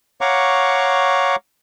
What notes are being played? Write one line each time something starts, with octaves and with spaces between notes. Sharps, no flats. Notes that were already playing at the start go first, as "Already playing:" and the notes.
C#5 F5 F#5 A#5 C#6 D6